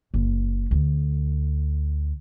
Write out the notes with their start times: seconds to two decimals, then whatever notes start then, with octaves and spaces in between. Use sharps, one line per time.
0.14 F#1
0.71 D2